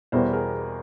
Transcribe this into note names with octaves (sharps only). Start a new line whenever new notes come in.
E2 B2 G3 B3 E4 A#4 C5
G#4 A#4